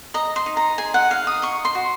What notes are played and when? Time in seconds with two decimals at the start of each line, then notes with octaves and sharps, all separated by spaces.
0.14 D#5 A#5
0.36 C6
0.46 D#4
0.57 A#5
0.78 G#4 G#5
0.94 F#5
1.10 D#4 F5
1.27 D#6
1.42 D#5 C#6
1.65 C6
1.75 F#4